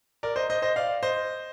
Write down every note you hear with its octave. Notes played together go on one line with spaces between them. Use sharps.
A#4 D5
C5 D#5
C5 D#5
C5 D#5
D5 F5
C5 D#5